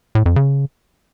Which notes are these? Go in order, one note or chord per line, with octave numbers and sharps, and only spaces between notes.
A2
F2
C#3